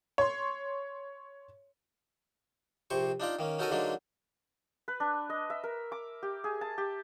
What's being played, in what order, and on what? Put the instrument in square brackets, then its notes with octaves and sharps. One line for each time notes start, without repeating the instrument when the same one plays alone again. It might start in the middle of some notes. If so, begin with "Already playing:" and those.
[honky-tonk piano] C#5 C6
[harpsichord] A#1 C3 C5 C#6
D4 D#4 F4 D5
D#3 A#3 C#4
C#4 D#4 F#4 A4 A#4 G#5
D3 F#3 G#3 A#3 D4 D#4
[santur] B4
D4
D#5
E5
A#4
D6
G4
G#4
A5
G4